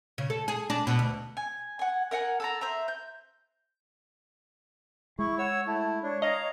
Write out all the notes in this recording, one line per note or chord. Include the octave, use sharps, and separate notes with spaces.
C#3
A4
G#4
D4
B2
D2
G#5
F#5 G#5
A#4 E5 F#5 G#5
A4 A5 A#5
C5 E5 A#5
G6
G#3 E4 C#6
C#5 F#5 E6
A3 E4 A5
D4 C#5
D#5 F5 A#5